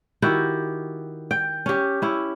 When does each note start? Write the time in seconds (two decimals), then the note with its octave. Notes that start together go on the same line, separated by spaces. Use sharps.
0.22 D#3 E4 F#4 G4
1.31 G5
1.66 C#4 G4
2.02 C#4 E4